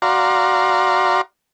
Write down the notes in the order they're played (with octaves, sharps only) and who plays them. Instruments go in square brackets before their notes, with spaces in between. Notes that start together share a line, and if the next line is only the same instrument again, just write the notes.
[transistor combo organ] F#4 D5 F5 A#5 C6